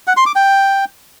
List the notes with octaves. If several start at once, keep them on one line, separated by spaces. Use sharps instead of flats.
F#5
C6
D6
G5